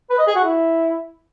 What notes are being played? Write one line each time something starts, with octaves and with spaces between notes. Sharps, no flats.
B4
D#5
G#4
F#4
E4